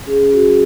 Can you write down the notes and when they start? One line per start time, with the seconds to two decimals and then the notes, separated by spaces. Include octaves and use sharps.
0.06 C#4 G#4
0.33 F#4
0.46 F#3